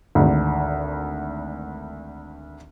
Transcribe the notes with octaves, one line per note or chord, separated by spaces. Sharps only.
G#1 D2